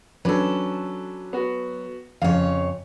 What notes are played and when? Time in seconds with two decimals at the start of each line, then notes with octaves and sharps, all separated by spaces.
0.25 F#3 C#4 D4 A4 B4
1.33 B3 F#4
2.22 F2 C#3 C#5 F5